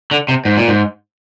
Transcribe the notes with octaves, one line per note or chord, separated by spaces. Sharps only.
D3
C3
G#2
A#2
G#2